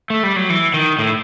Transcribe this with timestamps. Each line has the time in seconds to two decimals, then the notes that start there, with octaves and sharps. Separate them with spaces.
0.10 A3
0.23 G3
0.36 F#3
0.50 E3
0.74 D#3
0.99 A2